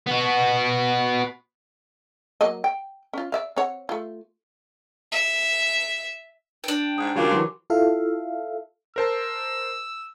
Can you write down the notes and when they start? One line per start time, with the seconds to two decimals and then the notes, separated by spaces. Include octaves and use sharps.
0.07 B3 F#4
2.41 F#3 A#3 D#5
2.64 G5
3.13 C#4 F4
3.32 D5 E5 F5
3.57 C4 C#5 F#5
3.89 A3 F4
5.12 E5
6.64 D4 G5
6.98 G#2 D#6
7.16 C#3 G3 F4 F#4 A#4 D6
7.31 E3 F#3 C6
7.70 E4 F4 A4 E5 F5
8.96 A#4 C5 A5 E6